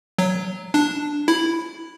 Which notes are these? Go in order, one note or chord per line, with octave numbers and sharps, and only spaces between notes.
F#3
D4
E4